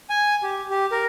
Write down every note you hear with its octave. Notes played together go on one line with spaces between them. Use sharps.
G#5
G4
G4
A#4